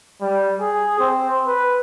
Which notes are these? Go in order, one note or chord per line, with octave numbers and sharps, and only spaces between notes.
G3
G#4
C4
B4